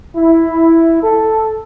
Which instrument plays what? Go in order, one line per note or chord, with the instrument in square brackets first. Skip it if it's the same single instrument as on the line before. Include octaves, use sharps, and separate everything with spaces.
[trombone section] E4
A4